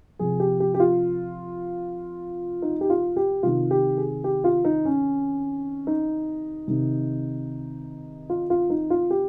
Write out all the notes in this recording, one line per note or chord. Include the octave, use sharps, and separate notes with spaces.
C3 F3 G#4
G4
G4
G4
F4
D#4
G4
F4
G4
C3 D#3 F4
G4
G#4
G4
F4
D#4
C#4
D#4
C3 D#3
F4
F4
D#4
F4
G4